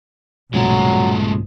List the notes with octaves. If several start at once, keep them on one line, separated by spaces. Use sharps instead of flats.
B1 G2 A#2 C#3 F3 F#3 G#3 A3